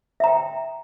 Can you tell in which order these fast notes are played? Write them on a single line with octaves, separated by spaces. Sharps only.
E5 A#5 G5